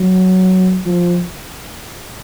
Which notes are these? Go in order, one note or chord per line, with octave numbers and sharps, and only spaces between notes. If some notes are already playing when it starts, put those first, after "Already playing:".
Already playing: F#3
F3